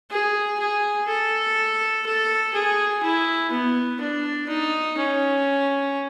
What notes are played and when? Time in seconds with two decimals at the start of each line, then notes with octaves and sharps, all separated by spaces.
0.11 G#4
0.59 G#4
1.08 A4
2.06 A4
2.53 G#4
3.03 E4
3.51 B3
4.00 D4
4.49 D#4
4.98 C#4